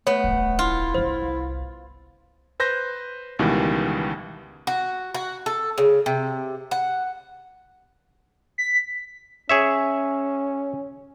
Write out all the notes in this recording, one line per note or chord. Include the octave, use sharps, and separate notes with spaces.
A3 B3 C#5
D1 G1
E4 F4
G1 C2 C5
B4 C5 G6 A#6
C#2 B2 D#3 E3 G3
F#4
F#4
A4
C#3
C3
F#5
B6
C#4 G#4 C#5 E5